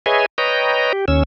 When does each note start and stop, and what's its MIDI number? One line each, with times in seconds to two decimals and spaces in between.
0.06 0.26 68
0.06 0.26 71
0.06 0.26 73
0.06 0.26 75
0.06 0.26 76
0.06 0.26 80
0.38 0.93 71
0.38 0.93 73
0.38 0.93 75
0.38 0.93 79
0.38 0.93 82
0.93 1.05 67
1.08 1.23 39
1.08 1.23 61
1.08 1.23 88